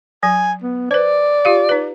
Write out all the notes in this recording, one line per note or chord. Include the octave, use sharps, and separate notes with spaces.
F#3 G#5
B3
B4 C5 D5
F4 G4 F5
D#4 B4